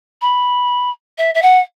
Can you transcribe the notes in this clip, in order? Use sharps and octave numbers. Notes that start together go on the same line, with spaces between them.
B5
E5
E5
F#5